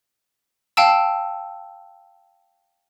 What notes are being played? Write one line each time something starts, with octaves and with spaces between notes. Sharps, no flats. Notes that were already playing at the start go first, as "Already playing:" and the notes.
F5 G5 A5 E6